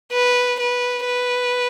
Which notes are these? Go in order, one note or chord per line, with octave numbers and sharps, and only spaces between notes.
B4
B4
B4